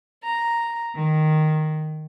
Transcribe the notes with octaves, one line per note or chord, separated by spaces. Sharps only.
A#5
D#3